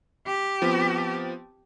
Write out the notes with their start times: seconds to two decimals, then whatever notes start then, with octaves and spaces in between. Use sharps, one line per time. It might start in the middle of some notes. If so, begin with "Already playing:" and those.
0.27 G4
0.62 F3 B3 C4